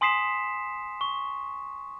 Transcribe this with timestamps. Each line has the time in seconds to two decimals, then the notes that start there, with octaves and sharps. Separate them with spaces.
0.01 G#5 C6 D#6 B6 C7 E7
1.01 C#6